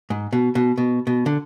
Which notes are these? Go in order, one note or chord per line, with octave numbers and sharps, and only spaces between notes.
G#2
B2
B2
B2
B2
D3